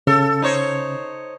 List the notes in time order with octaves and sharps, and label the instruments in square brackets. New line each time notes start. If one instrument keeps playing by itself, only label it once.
[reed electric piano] C#3 [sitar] A4
[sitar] D#4 C5 C#5